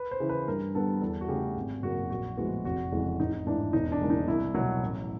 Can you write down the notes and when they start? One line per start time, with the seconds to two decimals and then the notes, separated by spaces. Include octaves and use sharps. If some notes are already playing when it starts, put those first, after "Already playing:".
Already playing: B4
0.11 C5
0.20 C#3 E3
0.29 B4
0.48 G2 A#4
0.75 D3 G3 B3 A4
1.02 E2 A4
1.21 F#4
1.29 C#3 E3 A3 G4
1.56 G#1
1.83 F#2 C#3 F#3 A#3 F#4
2.10 A#1 F#4
2.37 A2 F3 G#3 B3 F#4
2.65 F1 F#4
2.92 F2 C#3 E3 G#3
3.19 A1 D#4
3.47 G#2 E3 D4
3.73 E1 D#4
3.92 D4
4.01 D#2 C#3 E3 G#3
4.10 D#4
4.28 C2 E4
4.55 B2 F#3
4.83 A1